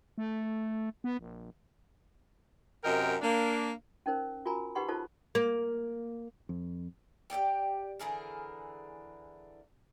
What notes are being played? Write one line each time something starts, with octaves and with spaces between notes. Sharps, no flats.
A3
B3
A#1
F#2 C3 A#4 D#5 G5
A#3 D4
C#4 D#4 A#4 C5
F4 F#4 A#4 G#5 A#5 B5
D#4 G4 B4 F#5 B5 C6
D#4 F4 A4 C5 A5
A#3
F2
G4 A4 D5 G5
D3 E3 G#4 A#4